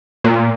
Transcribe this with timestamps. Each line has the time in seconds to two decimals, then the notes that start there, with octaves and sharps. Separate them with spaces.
0.24 A#2